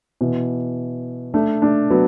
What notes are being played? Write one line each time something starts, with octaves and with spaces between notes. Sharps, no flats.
B2 E3
A3 D4
A3 D4
F#3 B3